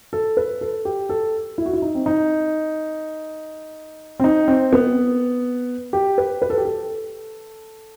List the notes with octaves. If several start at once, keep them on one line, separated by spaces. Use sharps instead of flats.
A4
B4
A4
G4
A4
E4
F#4
E4
D#4
C4
D#4
C4
D#4
C4
B3
G4
B4
B4
A4
G4
A4